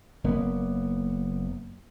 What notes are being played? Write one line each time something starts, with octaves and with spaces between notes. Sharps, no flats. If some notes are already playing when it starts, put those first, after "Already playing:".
F#1 A#3 B3